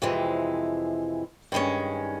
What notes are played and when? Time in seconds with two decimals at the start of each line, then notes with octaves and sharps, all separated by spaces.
0.02 F2 C3 E3 G#3
1.52 G2 D#3 G#3 C#4